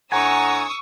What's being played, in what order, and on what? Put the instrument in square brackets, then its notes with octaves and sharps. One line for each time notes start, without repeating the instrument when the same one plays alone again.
[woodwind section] A2 D4 A#5 [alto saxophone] F#5 [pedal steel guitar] G#5 [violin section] C#6 D#6 E6